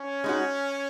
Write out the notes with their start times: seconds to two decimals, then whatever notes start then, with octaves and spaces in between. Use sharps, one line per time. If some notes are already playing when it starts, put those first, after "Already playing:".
Already playing: C#4
0.24 G#3 D#4 F#4